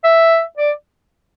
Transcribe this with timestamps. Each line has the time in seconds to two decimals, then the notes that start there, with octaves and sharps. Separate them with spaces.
0.04 E5
0.58 D5